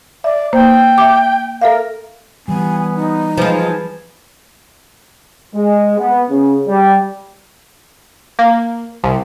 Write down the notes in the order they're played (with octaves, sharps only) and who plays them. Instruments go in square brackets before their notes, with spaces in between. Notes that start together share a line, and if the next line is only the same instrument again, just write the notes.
[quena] D5 [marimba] E5
[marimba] A#3 C5 [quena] G5
[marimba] E5 D6
[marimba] A4 E5 F5 [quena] A#4
[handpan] E3 G3 [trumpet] B3 [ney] G#5
[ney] D#4
[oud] F3 G#3 [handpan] B4 [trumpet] G#5
[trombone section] G#3
B3
C#3
G3
[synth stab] A#3
C2